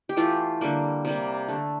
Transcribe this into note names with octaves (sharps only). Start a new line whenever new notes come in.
G4
E3 A3 F4
D3 G3 A#3
C3 G3 A#3
D3 A3